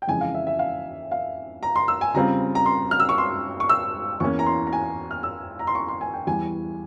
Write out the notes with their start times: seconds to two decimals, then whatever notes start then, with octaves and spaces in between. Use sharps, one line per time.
0.02 G5
0.08 F2 C#3 E3 G#3 G#5
0.21 F5
0.34 E5
0.47 E5
0.59 F5
1.12 F5
1.63 A#5
1.76 C6
1.88 E6
2.01 G#5
2.14 C#3 G3 C4 F4 A#5
2.55 A#5
2.66 C6
2.91 F6
3.00 E6
3.09 C#6
3.18 C6
3.60 C#6
3.69 E6
4.20 E2 E3 A#3 C#4 C#6
4.39 A#5
4.46 C6
4.67 A#5
4.73 G#5
5.11 F6
5.23 E6
5.59 A#5
5.67 C6
5.75 C#6
5.88 C6
6.01 G#5
6.14 G5
6.27 E2 E3 G3 G#5